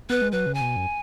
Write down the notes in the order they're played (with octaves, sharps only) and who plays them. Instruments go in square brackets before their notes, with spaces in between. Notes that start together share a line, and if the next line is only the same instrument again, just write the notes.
[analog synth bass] B3 [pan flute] B4
[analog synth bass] G#3
[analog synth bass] F#3 [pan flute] B4
[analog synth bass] C#3
[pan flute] G#5
[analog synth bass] B2
F#2